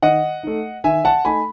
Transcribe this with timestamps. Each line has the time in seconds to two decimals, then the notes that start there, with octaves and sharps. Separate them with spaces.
0.02 D#3 D#5 F#5
0.43 A3 D#4
0.84 D#3 E5 G#5
1.05 F#5 A5
1.25 A3 D#4 G#5 B5